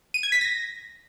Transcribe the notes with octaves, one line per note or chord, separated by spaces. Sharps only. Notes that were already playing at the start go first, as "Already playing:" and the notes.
D#7
G#6
B6
A#6